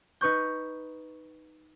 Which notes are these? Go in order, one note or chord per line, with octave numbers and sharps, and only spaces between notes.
D#4 B4 C#6 G6